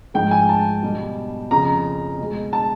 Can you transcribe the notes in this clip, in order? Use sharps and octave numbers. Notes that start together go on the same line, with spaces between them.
G#2 F3 G#3 G5
G#5
A5
B2 G3
F2 C#3 F3 A#5
B2 G#3
A5